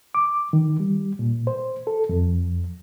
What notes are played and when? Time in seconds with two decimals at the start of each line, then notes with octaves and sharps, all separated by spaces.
0.15 D6
0.53 D#3
0.80 G3
1.19 A#2
1.47 C5
1.87 A4
2.09 F2